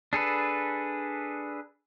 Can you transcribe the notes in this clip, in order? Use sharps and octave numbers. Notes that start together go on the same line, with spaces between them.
D4 G#4 A4 B4